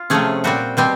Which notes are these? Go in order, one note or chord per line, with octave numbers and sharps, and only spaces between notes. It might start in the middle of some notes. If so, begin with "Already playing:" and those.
Already playing: F4
C3 F3 A3 C#4 G#4
A#2 G3 C4 F#4
B2 G3 C4